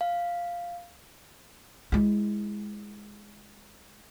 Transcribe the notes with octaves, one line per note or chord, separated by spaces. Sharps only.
F5
G#3 E4